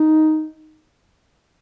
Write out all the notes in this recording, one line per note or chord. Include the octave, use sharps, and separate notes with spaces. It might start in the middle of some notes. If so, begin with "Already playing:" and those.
Already playing: D#4